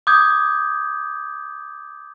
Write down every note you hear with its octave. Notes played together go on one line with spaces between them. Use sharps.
D6 D#6 G6 G#6